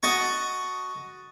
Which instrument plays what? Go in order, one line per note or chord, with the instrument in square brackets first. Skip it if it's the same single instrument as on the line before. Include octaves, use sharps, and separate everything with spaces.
[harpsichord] F#4 D#5 A5 C#6